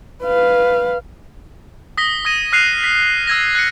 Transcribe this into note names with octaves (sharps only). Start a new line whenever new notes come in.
B4 F5
D#6 A#6 B6 G7
D#6 G#6 A#6 D#7
D#6 F6 F#6 C7 D#7 F7
B6
E6 G#6 A#6
F#6 C#7